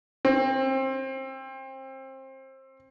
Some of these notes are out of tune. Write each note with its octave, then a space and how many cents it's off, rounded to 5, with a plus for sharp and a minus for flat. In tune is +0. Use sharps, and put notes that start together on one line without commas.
C4 +25